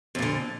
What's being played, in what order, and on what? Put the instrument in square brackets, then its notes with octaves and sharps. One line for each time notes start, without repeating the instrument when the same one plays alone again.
[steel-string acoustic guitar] F2
A#2
D3